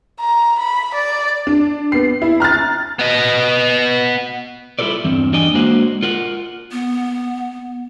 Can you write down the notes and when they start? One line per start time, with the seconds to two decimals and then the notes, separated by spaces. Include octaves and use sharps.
0.21 A#5
0.59 B5
0.94 D5
1.47 D4
1.92 B3 C7
2.22 E4
2.40 A#5 F6 F#6 A6
2.99 B3 D#5
4.79 G3 E4 F4 A4 B4 D5
5.05 E2 G2 C4
5.33 E2 G3 D4 D#5 G5 G#5
5.54 G#3 A#3 D4 F#4 C5 F#5
6.03 F4 A#4 F#5
6.72 B3